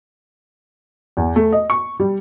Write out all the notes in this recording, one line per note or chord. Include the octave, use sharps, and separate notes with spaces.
E2
A3
D#5
C#6
G3